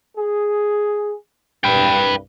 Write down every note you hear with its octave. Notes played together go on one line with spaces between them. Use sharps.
G#4
C2 G2 B4 G5